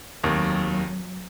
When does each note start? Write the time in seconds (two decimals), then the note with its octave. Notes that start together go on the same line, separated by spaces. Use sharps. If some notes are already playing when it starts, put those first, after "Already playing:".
0.23 F1 D#2 D#3 F#3